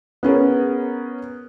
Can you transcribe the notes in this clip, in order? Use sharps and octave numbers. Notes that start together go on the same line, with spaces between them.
B3 C#4 G#4 A#4